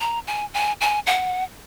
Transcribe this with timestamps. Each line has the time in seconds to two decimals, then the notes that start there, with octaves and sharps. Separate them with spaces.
0.01 A#5
0.27 G#5
0.54 G#5
0.81 G#5
1.07 F#5